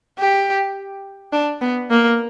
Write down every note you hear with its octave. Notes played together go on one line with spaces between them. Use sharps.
G4
D4
B3
A#3